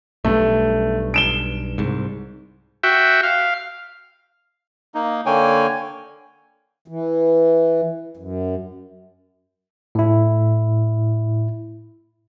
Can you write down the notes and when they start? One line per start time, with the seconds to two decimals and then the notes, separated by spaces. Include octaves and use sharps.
0.25 B1 G2 A3
1.14 D7 E7 G7
1.78 C2 G#2
2.83 F#4 E5 G5
3.23 F5
4.95 A#3 D#4
5.26 D3 A#3 C#5 G5 G#5
6.88 E3
8.17 F#2
9.95 A2 E4